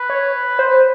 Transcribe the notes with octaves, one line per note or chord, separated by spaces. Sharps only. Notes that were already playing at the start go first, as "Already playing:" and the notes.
Already playing: B4
C#5
C5